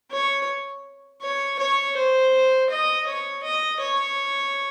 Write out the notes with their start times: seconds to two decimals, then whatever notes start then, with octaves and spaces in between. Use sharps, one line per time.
0.12 C#5
1.22 C#5
1.59 C#5
1.96 C5
2.70 D#5
3.07 C#5
3.44 D#5
3.81 C#5